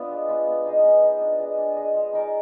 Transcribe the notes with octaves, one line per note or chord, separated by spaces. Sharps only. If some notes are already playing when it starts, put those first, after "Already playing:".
Already playing: B3 D4 F4 B4
G#3
B3 F4 B4
B3
D#4 G#4 D#5
B3
D#4 G#4 D#5
D4
G#4 D#5
D4
G#4 D#5
G#3
D#4 A#4 D5